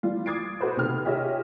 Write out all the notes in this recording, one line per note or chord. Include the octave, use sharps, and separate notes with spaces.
E3 F3 G3 F4
D6 D#6 G#6 A6 C7 D7
F#4 A4 B4 C5
C3 D#3 G4 F6
F4 G4 G#4 C#5 D#5 E5